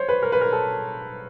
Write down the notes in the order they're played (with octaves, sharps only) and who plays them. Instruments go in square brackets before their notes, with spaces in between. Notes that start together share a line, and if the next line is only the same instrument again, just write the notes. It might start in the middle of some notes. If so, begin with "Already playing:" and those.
Already playing: [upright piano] C5 C#5
B4
A#4
B4
A#4
A4